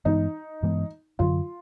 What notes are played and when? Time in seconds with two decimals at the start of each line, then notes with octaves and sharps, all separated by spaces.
0.05 G2 E3 G#3 B3 D#4
0.63 G2 E3 G#3 B3
1.19 F#2 D3 F#3 F4